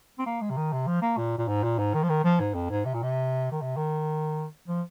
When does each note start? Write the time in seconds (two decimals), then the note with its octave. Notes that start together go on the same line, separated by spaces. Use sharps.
0.19 C4
0.26 A#3
0.41 G#3
0.50 C3
0.57 D#3
0.72 C3
0.87 F3
1.02 A#3
1.17 A#2
1.38 A#2
1.48 G#2
1.63 A#2
1.78 G#2
1.94 D#3
2.03 F3
2.09 D#3
2.24 F3
2.40 G#2
2.54 F2
2.70 G#2
2.85 C3
2.94 A#2
3.03 C3
3.51 D#3
3.62 C3
3.77 D#3
4.68 F3